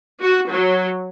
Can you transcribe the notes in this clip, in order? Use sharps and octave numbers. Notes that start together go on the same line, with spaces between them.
F#4
F#3